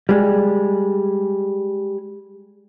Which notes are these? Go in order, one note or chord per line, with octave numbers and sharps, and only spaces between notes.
G3 G#3